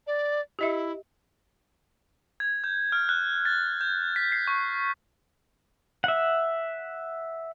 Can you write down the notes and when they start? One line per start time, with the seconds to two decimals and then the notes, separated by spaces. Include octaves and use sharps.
0.06 D5
0.59 E4 G4 D#5 E5
2.40 G#6
2.64 G6
2.92 F6
3.09 F#6
3.45 A6
3.81 G6
4.16 B6
4.32 C7
4.47 C#6
6.04 E5 F#5